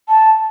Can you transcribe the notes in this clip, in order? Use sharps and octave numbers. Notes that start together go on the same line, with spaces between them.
A5